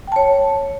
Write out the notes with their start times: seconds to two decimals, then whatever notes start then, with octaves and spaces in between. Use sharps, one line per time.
0.08 G5
0.12 A5
0.16 C#5